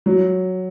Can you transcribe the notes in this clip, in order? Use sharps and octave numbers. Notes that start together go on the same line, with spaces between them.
F#3